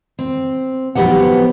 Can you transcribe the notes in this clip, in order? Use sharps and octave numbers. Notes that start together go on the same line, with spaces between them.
C4
F3 F#3 B3 D#4 G4 F#5